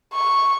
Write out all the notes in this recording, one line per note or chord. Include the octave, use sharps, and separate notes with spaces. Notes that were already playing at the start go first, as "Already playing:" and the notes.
C#6